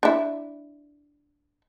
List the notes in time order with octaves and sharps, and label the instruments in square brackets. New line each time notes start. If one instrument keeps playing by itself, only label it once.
[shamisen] D4 E4